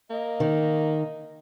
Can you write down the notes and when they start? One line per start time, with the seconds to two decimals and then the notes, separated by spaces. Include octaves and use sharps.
0.10 A#3 D#5
0.40 D#3